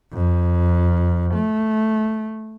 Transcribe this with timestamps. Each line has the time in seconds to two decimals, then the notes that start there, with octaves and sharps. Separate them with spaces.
0.14 F2
1.35 A3